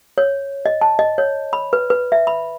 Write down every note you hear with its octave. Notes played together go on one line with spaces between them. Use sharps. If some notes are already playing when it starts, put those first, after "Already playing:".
C#5
D#5
A5
D#5
C#5
B5
B4
B4
E5
B5